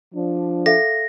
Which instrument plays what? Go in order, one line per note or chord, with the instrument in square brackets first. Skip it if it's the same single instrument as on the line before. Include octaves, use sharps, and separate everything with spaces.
[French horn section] F3 D4
[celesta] A4 E5 F5 [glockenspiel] A#6